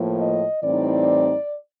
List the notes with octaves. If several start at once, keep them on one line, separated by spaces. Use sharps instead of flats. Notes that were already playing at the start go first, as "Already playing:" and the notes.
Already playing: A2 F3 A#3
D#5
A2 E3 G3 C4 D#4 D5